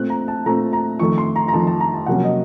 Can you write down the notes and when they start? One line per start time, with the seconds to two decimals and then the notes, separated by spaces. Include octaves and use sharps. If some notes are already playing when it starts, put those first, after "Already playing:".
Already playing: A#2 A3 C4 F#6
0.10 A#5
0.28 A5
0.46 A#2 A3 C4 A#5
0.73 A#5
0.99 F2 D#3 A3 C#6
1.18 C6
1.36 A#5
1.48 A#5
1.53 F2 D#3 A3 A5
1.67 A5
1.80 A#5
1.94 A5
2.06 F2 C3 F#3 A#3 C#4 F#5
2.24 D#5